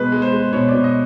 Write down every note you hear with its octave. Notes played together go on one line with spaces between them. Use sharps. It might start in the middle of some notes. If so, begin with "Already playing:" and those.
Already playing: B2 G#3 B4
G#3
C5
G#3
B2 C#5
D5
B2
D#5